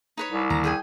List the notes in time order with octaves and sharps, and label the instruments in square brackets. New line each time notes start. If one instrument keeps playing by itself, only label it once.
[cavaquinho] D#4 B4 C#5
[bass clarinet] C2
[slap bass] D#2 D3 [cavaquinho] A#5
[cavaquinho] G#4 G5 G#5